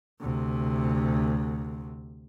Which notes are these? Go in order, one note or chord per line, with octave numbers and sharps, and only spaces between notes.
D2 C3